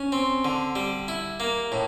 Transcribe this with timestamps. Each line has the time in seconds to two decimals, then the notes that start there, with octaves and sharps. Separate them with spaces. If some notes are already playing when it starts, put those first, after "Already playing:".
Already playing: C#4
0.12 C4
0.45 D3
0.76 G3
1.08 E4
1.40 A#3
1.72 A2